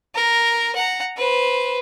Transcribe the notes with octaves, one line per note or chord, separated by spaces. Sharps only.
A#4
F#5 A#5
B4 C5